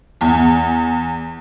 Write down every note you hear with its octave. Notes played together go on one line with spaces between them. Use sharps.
E2